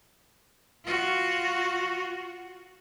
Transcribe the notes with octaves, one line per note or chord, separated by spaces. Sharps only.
F4 F#4